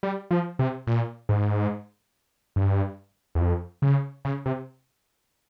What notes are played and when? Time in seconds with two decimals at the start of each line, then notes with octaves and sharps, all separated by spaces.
0.03 G3
0.31 F3
0.59 C3
0.87 A#2
1.29 G#2
2.56 G2
3.35 E2
3.40 F2
3.82 C#3
4.25 C#3
4.46 C3